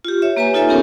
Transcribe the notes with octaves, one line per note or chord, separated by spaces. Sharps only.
F4 G4
C#5 E5
A#3 G4 B4 C#5 G#5 A#5
D#4 F4 A4 C#5 E5 G#5
B3 C#4 G4 A#4 C#5